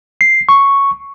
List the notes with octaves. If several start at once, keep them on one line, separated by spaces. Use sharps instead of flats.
C7
C#6